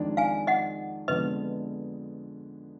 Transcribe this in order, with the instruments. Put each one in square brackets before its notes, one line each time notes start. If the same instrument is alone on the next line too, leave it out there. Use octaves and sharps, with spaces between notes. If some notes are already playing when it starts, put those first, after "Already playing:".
Already playing: [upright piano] F2 D#3 G#3 D4
[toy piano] F5 G#5
D#5 F#5
[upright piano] F2 D3 G#3 B3 [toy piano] B4 D#5